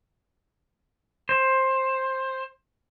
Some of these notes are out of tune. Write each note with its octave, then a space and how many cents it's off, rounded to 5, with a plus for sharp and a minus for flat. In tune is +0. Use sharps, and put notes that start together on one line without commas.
C5 +15